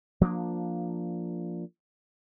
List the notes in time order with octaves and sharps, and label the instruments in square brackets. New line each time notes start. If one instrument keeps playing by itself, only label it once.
[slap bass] F3 A#3 B3 D4